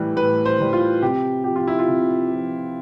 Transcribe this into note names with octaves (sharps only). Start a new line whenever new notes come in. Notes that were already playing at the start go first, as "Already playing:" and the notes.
Already playing: A2 E3 G3
A2 B4
C5
E3 G3
F4
C3 G4
F3 G4
F4
E4
F4
C3
F3